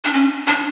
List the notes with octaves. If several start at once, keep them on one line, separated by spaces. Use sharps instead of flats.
D4
C#4
D4